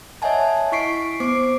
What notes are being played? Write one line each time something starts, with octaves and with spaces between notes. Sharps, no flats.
C#5 D#5 E5 F#5 G#5 A5
E4 C#6 B6 C7 D7
B3 C5 D6 C7 D7